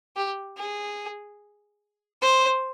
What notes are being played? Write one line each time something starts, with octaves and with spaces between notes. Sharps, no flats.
G4
G#4
C5